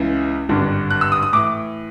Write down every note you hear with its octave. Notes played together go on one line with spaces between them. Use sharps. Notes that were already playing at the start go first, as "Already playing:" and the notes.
Already playing: C#2 C#3 E3
G#1 G2 D3
F#6
E6
D#6
D#6
A2 E3 D6